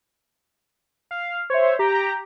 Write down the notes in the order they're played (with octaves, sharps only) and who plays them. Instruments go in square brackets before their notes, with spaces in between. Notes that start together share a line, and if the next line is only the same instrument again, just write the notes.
[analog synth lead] F5
[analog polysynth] C5 E5 [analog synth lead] C#5
[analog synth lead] G4 [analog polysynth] A#5